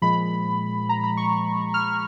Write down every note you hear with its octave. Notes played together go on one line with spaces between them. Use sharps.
A#2 F3 G#3 B5
A#5
B5
C#6
F6